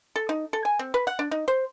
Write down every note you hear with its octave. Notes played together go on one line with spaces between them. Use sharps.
A4
D#4
A4
G#5
C4
B4
F#5
D4
D#4
C5